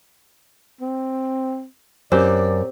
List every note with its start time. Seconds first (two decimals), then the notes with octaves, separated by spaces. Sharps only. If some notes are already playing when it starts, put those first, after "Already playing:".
0.81 C4
2.12 F#2 C4 G4 D5